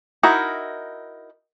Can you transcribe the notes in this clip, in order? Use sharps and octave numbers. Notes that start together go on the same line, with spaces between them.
D#4 E4 F#4 A#4